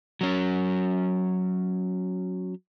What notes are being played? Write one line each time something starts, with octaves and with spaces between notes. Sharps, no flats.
F#3 C#4